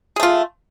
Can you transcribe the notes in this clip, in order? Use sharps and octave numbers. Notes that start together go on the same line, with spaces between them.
A3 F4 G#4